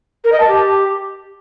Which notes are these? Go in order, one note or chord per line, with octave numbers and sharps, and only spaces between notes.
A#4
D#5
A5
G4